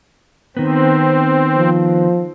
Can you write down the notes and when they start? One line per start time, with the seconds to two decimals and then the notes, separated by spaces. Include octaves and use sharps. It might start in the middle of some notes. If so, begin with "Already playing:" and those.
0.57 D#3 B3 C4
1.57 F3